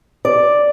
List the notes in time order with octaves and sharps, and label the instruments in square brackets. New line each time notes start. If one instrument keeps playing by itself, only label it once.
[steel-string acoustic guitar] D5